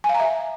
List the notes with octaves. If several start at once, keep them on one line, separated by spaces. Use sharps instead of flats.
G#5
F5
A#5
E5